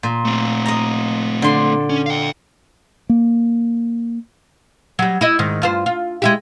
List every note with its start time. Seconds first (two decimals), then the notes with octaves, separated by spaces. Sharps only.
0.03 A#2
0.25 A3 C4
0.65 D#5 A#5
1.42 D3 C6
1.89 C#4
2.06 F5 G5
3.09 A#3
4.99 F#3 G3
5.21 E4 D#5
5.39 G#2 D#3
5.62 G2 F4 C5
5.86 F4
6.22 G#3 E4 G4